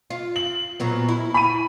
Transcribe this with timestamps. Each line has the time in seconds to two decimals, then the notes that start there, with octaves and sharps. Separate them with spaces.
0.10 F4
0.36 F#7
0.80 A#2 F#3 B3
1.09 E4
1.34 B5 D#7